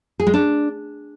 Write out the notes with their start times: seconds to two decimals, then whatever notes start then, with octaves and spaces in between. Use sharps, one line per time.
0.20 G#4
0.27 G#3
0.34 D4